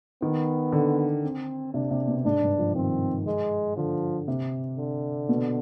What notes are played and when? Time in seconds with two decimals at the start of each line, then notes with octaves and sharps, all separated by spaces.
0.22 D#3 B3
0.72 D3
1.23 C4
1.74 C3 D4
1.91 C3
2.08 B2
2.24 G#2 D4
2.42 G2
2.59 F3
2.75 D#3 C4
3.26 G#3
3.76 D3 F3
4.28 C3
4.78 D3
5.29 B2